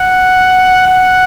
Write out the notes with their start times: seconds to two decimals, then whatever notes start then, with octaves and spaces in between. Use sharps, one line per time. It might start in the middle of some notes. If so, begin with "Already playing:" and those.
Already playing: F#5
0.87 F#5